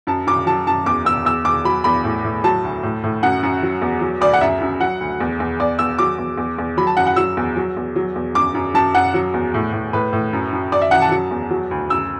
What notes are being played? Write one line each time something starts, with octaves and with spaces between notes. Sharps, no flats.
F#2 A5
F#2 D6
F#3 A5
F#2 A5
E2 D6
E2 E6
E2 E6
E2 D6
F#3 B5
E2 B5
A2
A2
F#3 A5
D2
A2
A2
F#2 F#5
F#2
F#3
E2
F#3
D2 D5
F#5
F#2 E5
F#2
F#3 F#5
D2
E2
E2
E2 D5
E2 E6
F#3 D6
E2
E2
E2
F#3 B5
A5
F#2 F#5
F#5
F#3 E6
E2
F#3
E2
F#3
E2
F#2 D6
F#2
F#2 A5
F#2 F#5
F#3
E2
A2
A2
A2 B4
A2
F#2
F#2
F#2 D5
E5
F#2 F#5
A5
F#3
E2
F#3
D2
F#2 E6